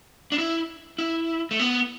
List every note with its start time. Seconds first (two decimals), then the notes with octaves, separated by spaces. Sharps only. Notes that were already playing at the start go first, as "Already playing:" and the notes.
0.32 D4
0.38 E4
0.98 E4
1.51 A3
1.59 B3